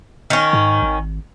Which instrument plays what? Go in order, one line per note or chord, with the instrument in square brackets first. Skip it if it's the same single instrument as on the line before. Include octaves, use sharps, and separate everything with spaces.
[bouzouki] D#3 C#4
[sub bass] G#2
G#1